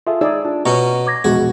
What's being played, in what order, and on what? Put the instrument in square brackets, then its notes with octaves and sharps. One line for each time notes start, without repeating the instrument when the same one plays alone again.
[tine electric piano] F4 G#4 A4 [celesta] E5
[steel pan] D#4 G#4 D5 [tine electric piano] E6
[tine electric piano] D4 [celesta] F4
[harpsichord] B2 C#4 [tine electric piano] A#5 C#6
[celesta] D6 G#6 A#6
[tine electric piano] A#1 E2 B2 [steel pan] G#3 [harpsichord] F#4 [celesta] G#4